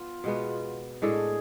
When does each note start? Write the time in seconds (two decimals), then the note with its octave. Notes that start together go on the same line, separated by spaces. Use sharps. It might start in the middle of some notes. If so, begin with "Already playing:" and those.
Already playing: B3 F4
0.24 B2 G#3 B3
1.02 A2 G#3 D4 G#4 A4